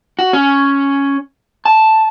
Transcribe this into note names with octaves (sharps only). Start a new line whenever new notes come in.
F#4
C#4
A5